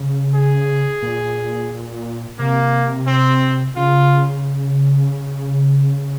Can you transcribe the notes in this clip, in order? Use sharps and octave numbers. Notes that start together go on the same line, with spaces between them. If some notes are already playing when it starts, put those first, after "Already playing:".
Already playing: C#3
G#4
A#2
C3 A#3
C4
C#3 F4